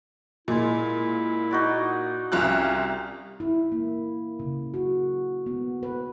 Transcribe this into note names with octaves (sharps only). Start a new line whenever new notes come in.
A#2 G#3 E4
D#4 F#4 D5
C2 C#4 F4 E6 F#6
E4
A#3
C#3
F#4
B3
B4